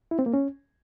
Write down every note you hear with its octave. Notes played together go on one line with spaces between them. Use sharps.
E4
C4
A#3
C#4